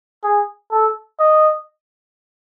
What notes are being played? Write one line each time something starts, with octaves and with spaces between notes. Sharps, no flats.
G#4
A4
D#5